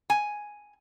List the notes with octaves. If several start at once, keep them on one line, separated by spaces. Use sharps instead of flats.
G#5